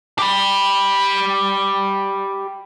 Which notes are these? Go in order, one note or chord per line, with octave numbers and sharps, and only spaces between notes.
G4 B5